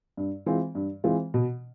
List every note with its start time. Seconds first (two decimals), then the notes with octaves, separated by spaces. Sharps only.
0.17 G2
0.46 E3 G#3 C4 F4
0.75 G2
1.04 E3 G#3 C4 F4
1.34 B2